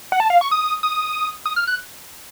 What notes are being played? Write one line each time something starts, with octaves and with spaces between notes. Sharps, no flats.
F#5
A5
F5
C#6
D#6
D#6
D#6
F6
F#6